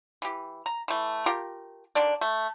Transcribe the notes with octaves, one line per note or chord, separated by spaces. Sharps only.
E3 G4
A#5
E3 A3
F4 G4 A#4
D3 D#3 D4 D5
A3